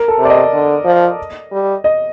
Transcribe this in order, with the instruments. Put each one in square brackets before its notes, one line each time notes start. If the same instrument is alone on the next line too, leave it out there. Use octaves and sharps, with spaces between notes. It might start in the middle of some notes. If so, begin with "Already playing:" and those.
Already playing: [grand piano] A#4
A4
[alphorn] C3
[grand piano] D5
D#5
[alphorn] D3
F3
G3
[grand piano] D#5